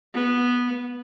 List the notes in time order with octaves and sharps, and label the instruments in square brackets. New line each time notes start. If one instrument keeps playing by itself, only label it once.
[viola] B3